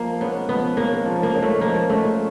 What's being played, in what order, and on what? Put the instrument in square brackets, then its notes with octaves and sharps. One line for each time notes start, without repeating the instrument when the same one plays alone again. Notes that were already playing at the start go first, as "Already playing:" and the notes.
Already playing: [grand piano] F3 [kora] A#3
[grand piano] G#3 C#4 [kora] B3
[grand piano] F3 [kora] B3
[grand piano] G#3 C#4 [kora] A#3
[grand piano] F3
[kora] A#3
[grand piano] G#3 C#4
[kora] A3
[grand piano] F3 [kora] A#3
[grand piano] G#3 C#4 [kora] A3